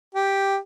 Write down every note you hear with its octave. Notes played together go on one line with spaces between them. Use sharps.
G4